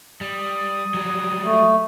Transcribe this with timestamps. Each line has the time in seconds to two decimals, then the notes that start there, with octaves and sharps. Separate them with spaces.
0.21 G3 D#6
0.94 F#3 G3
1.44 A3